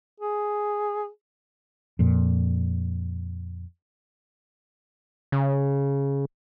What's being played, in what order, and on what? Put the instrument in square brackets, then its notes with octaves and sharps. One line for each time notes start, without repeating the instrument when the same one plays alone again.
[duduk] G#4
[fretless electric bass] F2 A#2
[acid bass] C#3